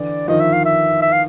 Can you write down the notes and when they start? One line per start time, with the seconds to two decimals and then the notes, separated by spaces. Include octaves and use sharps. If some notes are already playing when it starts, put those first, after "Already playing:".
Already playing: D3 E3 D5
0.28 D#3 F3 D#5
0.40 E5
0.53 F5
0.65 E5
1.02 E5
1.12 F5